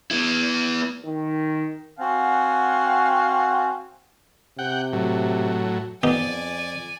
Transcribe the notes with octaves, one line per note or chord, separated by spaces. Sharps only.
B3 E4
D#3
C4 F#4 F5 F#5 G#5
C3 F#5 G5
A2 F#3
F2 B3 D#4 G4 D5 G#5